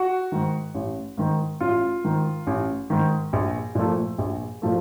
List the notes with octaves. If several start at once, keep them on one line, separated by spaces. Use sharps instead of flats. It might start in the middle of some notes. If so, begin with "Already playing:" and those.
Already playing: F#4
G#2 D#3
A1
G#2 D#3
A1 F4
G#2 D#3
A1
G#2 D#3
A#1
A#2 F3 A3
A#1
A#2 F3 A3